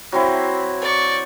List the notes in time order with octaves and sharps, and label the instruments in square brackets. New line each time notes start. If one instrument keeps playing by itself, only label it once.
[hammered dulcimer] F#3 C4 E4
[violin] D5 C#6